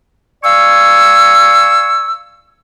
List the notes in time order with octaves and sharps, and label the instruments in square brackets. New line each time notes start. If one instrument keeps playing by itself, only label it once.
[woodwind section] D5 F5 G#5 C#6 E6